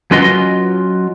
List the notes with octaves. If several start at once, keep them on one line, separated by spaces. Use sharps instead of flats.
F#3 C#4 F4 B4 D#5 C6